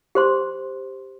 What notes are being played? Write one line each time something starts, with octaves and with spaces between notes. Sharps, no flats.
G4 C5 C6